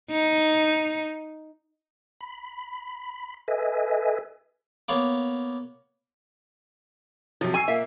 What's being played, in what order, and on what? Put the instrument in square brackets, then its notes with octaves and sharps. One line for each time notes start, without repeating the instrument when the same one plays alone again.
[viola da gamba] D#4
[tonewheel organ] B5
A4 B4 D#5 E5 G#5
[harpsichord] A#3 B3 C#5 F5
[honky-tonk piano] C3 F#3 [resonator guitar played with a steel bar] F3
[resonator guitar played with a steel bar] G#5 [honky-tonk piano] C#6 E6 C7
[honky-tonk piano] A#2 A#3 [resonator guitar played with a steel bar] E5